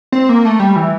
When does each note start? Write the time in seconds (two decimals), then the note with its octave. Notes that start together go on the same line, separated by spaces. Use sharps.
0.12 C4
0.29 A#3
0.45 A3
0.59 G3
0.76 E3